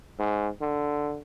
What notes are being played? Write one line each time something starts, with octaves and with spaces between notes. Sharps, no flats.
G#2
D3